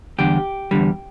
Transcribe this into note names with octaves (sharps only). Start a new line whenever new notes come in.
E2 D3 G3 G4
E2 D3 G3